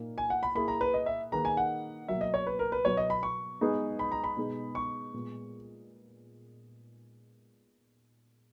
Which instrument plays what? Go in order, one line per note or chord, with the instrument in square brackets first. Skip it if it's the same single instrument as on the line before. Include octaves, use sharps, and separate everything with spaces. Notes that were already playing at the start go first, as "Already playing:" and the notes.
Already playing: [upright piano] A#2 A#3 D#4
[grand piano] G#5
F#5
B5
[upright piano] A#3 E4 G#4 [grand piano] B5
[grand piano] A#5
B4
D#5
E5
[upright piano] D#3 A#3 D#4 G#4 B4 [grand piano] A#5
[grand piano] G#5
F#5
[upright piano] B2 F#3 A#3 [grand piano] E5
[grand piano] D#5
C#5
B4
A#4
B4
[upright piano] B2 F#3 B3 [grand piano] C#5
[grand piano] D#5
B5
C#6
[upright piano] G#3 B3 D#4 G#4 B4
[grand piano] B5
A#5
B5
[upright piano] B2 G#3 D#4 G#4
[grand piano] C#6
[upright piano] A#2 G#3 B3